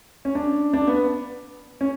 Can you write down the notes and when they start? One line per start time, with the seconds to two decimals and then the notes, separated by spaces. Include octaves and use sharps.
0.25 C#4
0.35 D4
0.73 D4
0.87 B3
1.81 C#4